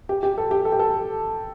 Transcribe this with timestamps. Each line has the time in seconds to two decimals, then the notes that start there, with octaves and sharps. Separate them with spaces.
0.09 G4
0.23 G4
0.38 A4
0.51 G4
0.65 A4
0.72 G4
0.79 A4